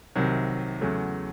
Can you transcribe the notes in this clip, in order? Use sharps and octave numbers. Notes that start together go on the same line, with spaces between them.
C2 C3 D#3 F#3
E2 C#3 F#3 A3